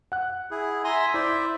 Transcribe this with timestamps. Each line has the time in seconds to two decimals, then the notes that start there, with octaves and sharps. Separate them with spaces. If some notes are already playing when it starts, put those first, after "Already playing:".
0.12 F#5 F#6
0.51 E4 G#4
0.84 E5 G#5 A#5 C6
1.14 E4 C5 D5